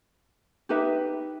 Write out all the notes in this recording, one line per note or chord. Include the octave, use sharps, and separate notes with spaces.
D#4 G4 B4 E5